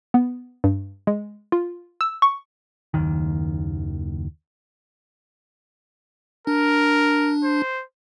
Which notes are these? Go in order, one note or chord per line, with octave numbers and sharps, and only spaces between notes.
B3
G2
G#3
F4
E6
C#6
F#1 D#2 D#3
D4 A#4
C5